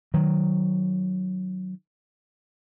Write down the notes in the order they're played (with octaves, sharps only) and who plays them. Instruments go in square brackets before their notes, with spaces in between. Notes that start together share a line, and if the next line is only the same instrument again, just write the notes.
[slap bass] D#3 F#3